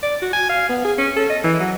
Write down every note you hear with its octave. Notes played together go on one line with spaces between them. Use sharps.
D5
F#4
G#5
F5
B3
G#4
C#4
A4
D#5
E3
F#3